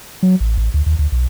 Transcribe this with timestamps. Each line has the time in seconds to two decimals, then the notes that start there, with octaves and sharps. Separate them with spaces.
0.23 F#3
0.40 A1
0.57 A1
0.74 D2
0.86 D#2
0.99 D2
1.12 B1